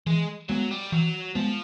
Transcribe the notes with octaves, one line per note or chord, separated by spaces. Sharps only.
E3 G#3
F#3 G#3 B3
G3
E3 F#3
F3 G#3 B3